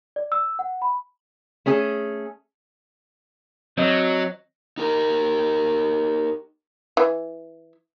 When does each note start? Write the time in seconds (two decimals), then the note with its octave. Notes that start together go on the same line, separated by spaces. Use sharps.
0.16 D5
0.32 E6
0.59 F#5
0.82 B5
1.66 A3 C#4 G#4 A4
3.78 F#3 C4 D#5
4.78 D#4 G4 A#4
6.97 E3